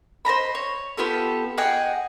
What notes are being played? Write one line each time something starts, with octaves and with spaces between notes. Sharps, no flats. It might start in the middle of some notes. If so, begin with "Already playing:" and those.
C5 D#5 A#5 B5
C#5
B3 F4 G4 A4
G#4 D#5 F#5 G5